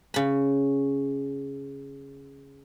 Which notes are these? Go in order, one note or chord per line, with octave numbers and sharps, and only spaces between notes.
C#3 B5